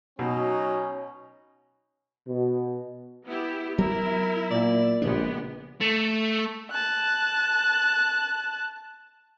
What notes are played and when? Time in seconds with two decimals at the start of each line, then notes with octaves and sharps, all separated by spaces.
0.19 B2 F#3 C#4 D#4
2.28 B2
3.26 B3 E4 G4
3.78 F#3 B3 C4 E4 A#4
4.51 A#2 D5
5.02 A#1 A#2 C#3 G#3 B3 D4 G4
5.81 A3
6.71 A5 F#6